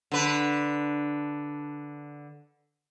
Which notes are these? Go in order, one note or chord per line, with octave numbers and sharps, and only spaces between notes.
D3 B4